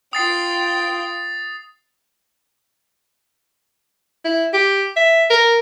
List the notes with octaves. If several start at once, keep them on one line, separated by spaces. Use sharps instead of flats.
F4 G5 D#6 A6 C7
E4
G4
E5
A#4